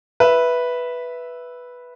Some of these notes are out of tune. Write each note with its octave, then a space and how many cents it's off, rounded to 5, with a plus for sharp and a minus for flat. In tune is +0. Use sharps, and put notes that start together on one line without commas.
B4 -5 E5 +0